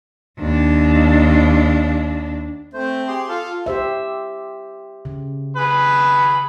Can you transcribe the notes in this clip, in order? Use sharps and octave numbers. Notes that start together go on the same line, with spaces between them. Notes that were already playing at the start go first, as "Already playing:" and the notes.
D#2 D4
A3 C4 C5
G4 G#4 C6
F4 A4 F5
G4 C5 E5
C#3
G#4 B4 B5